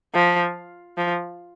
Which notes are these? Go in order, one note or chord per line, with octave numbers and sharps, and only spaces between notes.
F3
F3